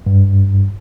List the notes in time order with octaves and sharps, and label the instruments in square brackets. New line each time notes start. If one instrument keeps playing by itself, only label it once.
[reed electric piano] G2